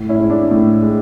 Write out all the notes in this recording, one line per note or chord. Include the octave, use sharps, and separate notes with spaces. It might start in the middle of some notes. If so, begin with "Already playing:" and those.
Already playing: A2
C#4 E4
G#3
D4
A2
G#3